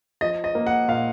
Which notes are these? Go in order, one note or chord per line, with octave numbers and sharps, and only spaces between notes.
F3 D#5
D#5
A#3
F#5
A#2 F5